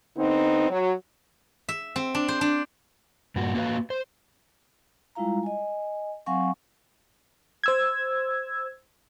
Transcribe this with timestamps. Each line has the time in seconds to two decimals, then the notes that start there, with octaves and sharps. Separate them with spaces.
0.16 D3 B3 C4 D#4
0.70 F#3
1.69 E5
1.96 C4
2.15 D4
2.28 C5
2.41 D4
3.36 G2 A#2 F#4
3.55 A#3 F#4 B4 F5
3.90 C5
5.15 G3 G#3 E4 F4 F5 A#5
5.43 D#5 G#5
6.26 F#3 C4 F5 F#5 G#5 C#6
7.64 C5 E6 G#6